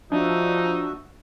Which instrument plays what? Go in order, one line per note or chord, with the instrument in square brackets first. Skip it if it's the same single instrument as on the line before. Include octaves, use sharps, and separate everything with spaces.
[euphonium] F3 [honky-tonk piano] D4 [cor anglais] D#4 [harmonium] F#4 E5